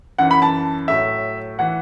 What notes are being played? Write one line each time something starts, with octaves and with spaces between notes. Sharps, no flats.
F#2 E3 F#5
B5
A5
A2 F#3 E5
E3 F#5